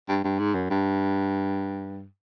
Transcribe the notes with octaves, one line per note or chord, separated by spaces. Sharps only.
G2
G2
G#2
F#2
G2